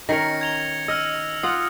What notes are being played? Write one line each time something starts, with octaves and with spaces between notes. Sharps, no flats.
D#3 C#4 A#4 A#6 C#7
G#6 F7 G7
D#5 E6 F6
F4 F#5 D#6